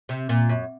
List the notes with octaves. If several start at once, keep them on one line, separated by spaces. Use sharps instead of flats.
C3
A#2
F#2